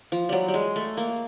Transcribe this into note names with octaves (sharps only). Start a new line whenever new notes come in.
F3
F#3 G3
G3
G#3
A3
A#3